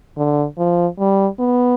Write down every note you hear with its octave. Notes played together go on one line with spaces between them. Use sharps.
D3
F3
G3
B3